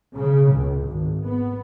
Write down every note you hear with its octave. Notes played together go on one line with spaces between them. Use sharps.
C#3
C#2
G#1
B3